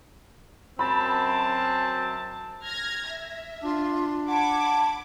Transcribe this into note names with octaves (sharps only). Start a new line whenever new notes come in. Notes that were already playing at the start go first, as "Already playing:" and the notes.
F#2 C4 A5 B5
F6 G#6 A#6
E5
D4 F4
F#5 A5 B5 D6 G#6